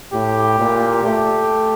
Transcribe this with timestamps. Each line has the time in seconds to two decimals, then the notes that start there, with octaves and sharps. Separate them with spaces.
0.13 A2 G4
0.59 A#2
1.04 A3 G4